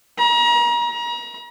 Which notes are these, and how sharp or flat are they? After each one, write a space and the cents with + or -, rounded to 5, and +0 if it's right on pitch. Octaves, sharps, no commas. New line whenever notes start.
A#5 +35
A#5 +35